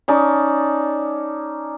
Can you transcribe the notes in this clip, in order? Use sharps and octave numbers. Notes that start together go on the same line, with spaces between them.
C#4 D#4 D5 A5